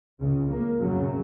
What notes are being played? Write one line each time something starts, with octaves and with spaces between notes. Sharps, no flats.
C#2 C#3
A#3
F#2 C#3 F#3